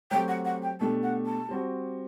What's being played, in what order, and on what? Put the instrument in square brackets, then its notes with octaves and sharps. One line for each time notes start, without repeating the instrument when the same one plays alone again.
[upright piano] F#3 A3 C4 G4 [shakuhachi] G5
[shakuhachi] F#5
F#5
G5
[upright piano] B2 A3 D4 G4 [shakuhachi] A5
[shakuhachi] F#5
A5
[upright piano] G3 C4 F#4